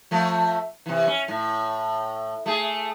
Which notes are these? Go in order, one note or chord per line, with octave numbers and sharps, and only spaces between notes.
F3 A3
C3 E3
C#4
A2
A3 G#4